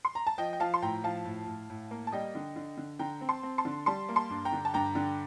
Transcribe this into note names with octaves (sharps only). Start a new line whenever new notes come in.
C6
A#5
A5
F3 D#5 G5
G5
F3 F5 A5
C6
A2 G5 A#5
F3 F5 A5
A2
A2
A2
A#3
A5
G3 D#5 G5
D3
D3
D3
D3 G5 A#5
C4
A5 C6
C4
A5 C6
D3
G3 A5 C6
A#3
A5 C6
G2
G5 A#5
D3
A5
G2 G5 A#5
D3